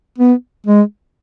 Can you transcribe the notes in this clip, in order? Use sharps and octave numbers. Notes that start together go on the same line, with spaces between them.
B3
G#3